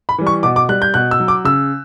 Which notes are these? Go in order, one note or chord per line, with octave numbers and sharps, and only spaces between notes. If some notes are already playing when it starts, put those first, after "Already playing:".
B5
E3 G3
C#6
B2 D6
D6
G3 F#6
G6
B2 F#6
E6
F#3
D6
C#3 E6